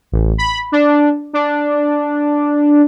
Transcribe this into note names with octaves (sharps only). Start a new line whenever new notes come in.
A1
B5
D4
D4